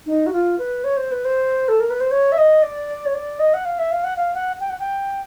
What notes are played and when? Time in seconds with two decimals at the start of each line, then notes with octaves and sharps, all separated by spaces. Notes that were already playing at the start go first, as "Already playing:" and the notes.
0.06 D#4
0.27 F#4
0.33 F4
0.58 B4
0.84 C#5
0.97 C5
1.12 B4
1.25 C5
1.69 A4
1.80 A#4
1.90 B4
2.00 C5
2.11 C#5
2.32 E5
2.38 D#5
2.63 D5
3.06 C#5
3.14 D5
3.39 D#5
3.54 F#5
3.65 F5
3.79 E5
3.91 F5
4.04 F#5
4.17 F5
4.34 F#5
4.60 G5
4.69 F#5
4.80 G5